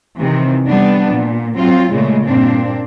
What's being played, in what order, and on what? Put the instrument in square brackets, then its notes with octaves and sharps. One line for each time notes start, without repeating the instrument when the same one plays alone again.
[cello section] C3 D#3 E3
G3 B3 D4
A#2
F#3 C4 F4
A#2 C#3 G#3 A3
G2 A#2 C4 D4